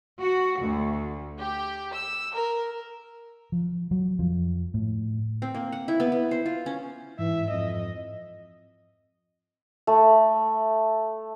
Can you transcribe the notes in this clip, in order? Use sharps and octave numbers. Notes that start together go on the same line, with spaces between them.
F#4
D2
G4
E6
A#4
F3
F#3
F2 F3
A2
C4
A#3
F#5
E4
B3
B3
C5
F4
C#4
G#2 E3 E5
F2 D#5
A3